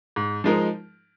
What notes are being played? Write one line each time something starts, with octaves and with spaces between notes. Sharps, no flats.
G#2
F3 G#3 D#4 A#4